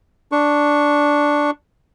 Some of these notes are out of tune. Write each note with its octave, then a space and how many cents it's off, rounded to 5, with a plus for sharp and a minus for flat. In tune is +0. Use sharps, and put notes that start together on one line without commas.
D4 +0 C#6 +0